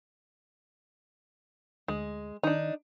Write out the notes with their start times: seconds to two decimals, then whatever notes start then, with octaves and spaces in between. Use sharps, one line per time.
1.88 D2 G#3
2.43 D#3 D4 D#4